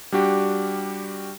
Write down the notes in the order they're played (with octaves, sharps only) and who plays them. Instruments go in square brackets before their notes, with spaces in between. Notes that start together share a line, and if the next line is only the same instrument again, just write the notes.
[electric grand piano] G3 D4 F#4 G4